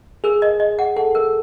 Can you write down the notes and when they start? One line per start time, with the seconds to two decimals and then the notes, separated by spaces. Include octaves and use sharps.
0.24 G#4 A#4
0.42 D#5
0.60 D#5
0.79 F#5
0.97 A4 F#5
1.15 A#4